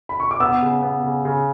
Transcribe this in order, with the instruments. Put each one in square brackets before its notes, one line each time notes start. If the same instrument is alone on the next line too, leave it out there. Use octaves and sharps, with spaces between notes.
[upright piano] B5
C#6
D6
[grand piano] B3 [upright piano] E6
[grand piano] C#3
B3
C#3
C#3